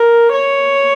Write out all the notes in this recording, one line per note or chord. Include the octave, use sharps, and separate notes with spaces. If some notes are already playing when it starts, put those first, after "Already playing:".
Already playing: A#4
C#5